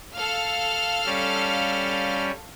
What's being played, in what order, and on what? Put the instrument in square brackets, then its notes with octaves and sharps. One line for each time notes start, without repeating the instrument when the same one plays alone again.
[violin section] A4 F5 F6
[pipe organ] G3 C#4